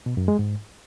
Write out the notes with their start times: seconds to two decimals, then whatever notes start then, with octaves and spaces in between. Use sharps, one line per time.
0.06 B2
0.17 F#2
0.28 G#3
0.39 G#2